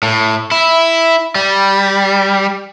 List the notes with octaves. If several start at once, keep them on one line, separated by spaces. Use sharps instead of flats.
A2
E4
G3